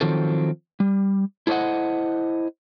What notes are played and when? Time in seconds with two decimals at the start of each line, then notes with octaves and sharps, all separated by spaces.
0.01 D#3 F3 F#3 C4 A4
0.80 G3
1.47 E4 A4 C5 D5 D#5 F#5